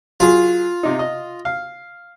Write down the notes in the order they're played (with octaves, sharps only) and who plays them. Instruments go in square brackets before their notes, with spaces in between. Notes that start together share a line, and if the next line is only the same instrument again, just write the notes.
[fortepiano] F#3 G#4 [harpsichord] F4
[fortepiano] C3 D#4
D#5
F5